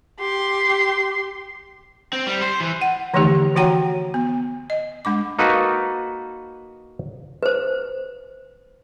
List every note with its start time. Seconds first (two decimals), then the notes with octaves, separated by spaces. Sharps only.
0.20 G4 C6
2.13 C4
2.27 G3
2.42 C5
2.60 E3
2.81 F#5
3.14 D3 E3 F3 A3 D#4 G4
3.56 E3 F#4 C#5 F#5 G5 A#5
4.14 B3
4.70 D#5
5.05 G#3 D4 D6
5.39 A#3 D#4 F#4 A4 B4
7.43 B4 C5